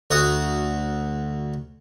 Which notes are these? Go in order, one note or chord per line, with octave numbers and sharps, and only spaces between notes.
D2 F#4 D#6